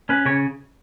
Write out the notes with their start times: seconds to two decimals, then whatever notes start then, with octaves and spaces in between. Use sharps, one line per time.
0.09 C#4 B4
0.26 C#3 C#5